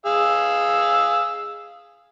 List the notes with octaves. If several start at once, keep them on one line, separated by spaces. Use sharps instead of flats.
G#4 F5 E6